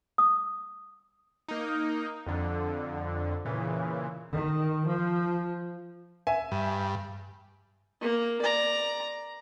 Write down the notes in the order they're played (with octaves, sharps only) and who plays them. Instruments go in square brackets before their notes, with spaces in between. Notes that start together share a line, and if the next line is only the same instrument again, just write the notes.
[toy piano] D#6
[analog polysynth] A#3 D#4
F2 D3
A#2 C#3 E3
[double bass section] D#3
F3
[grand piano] E5 G#5
[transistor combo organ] G2
[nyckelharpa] A#3
D5 A#5